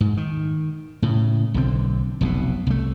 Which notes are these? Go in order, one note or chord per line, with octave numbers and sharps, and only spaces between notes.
G#2
D#3
A2 C#3
B1 D3 C4
F1 B1 B2
C2 A3